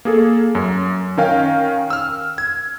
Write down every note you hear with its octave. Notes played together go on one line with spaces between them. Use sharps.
A#3 G#4 A4
F#2
D#3 C#4 A#4 F5 G5
E6 F6
G#6